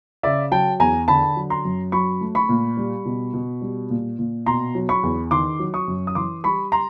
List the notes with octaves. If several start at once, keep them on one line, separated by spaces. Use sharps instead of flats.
C#3 D5 E5
F#3 G5 A5
E2 G#5 A#5
D3 A5 B5
F#3
A#5 C6
F#2
F#3 B5 C#6
A3
B5 C#6
A#2
G3
B2
B2
G3
A#2
A#2
B2 A#5 C6
F#3
B5 C#6
E2
D#3 C6 D6
F#3
C#6 D#6
F#2
D#6
E3 C6 D6
G3 B5 C#6
A#5 C6